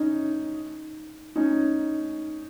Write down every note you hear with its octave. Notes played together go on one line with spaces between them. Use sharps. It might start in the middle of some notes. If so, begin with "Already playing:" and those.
Already playing: C#4 D#4
C#4 D#4